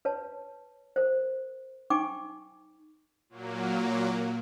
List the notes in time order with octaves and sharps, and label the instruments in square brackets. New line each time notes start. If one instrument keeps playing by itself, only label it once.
[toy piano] B4 C#5 A5
A#4 C5
D#4 G5 G#5 C#6 D6
[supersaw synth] A#2 F#3 A#3